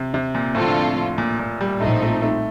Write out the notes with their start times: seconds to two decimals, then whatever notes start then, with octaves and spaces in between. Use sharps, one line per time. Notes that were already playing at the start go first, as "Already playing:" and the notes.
Already playing: C3
0.14 C3
0.35 A#2
0.55 A2 D3 F3 C4 F4 A4
1.18 A#2
1.39 A#2
1.61 G3
1.81 A#1 A2 F3 A3 C4 D#4
2.02 A3
2.22 A3